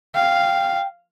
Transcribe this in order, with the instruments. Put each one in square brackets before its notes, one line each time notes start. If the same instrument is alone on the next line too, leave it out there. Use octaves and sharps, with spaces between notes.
[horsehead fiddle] F5 [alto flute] G5